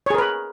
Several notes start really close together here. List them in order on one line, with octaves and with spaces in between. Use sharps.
C#5 G#4 A#4 B4